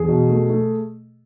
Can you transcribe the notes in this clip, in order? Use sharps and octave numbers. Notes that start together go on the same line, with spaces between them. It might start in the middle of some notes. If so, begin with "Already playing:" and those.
Already playing: E2 G#4
B2
A3
A3